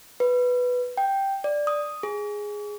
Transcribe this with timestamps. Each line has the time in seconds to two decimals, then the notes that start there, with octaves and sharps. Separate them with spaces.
0.20 B4
0.97 G5
1.44 D5
1.67 D#6
2.03 G#4